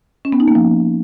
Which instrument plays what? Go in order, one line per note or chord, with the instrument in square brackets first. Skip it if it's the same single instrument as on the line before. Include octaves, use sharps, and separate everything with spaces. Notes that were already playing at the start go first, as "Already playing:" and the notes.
[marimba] C#4
B3
D#4
A#3
F3